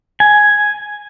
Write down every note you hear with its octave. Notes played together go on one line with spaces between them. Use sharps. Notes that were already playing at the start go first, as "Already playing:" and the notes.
G#5